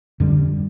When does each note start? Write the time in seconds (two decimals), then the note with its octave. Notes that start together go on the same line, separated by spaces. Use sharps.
0.20 F2 D3 G3